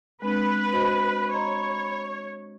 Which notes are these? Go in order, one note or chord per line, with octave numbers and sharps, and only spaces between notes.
G#3 C4 D4 B4
F#4 C5 D#5 B5
C#5 D#5 A#5 C6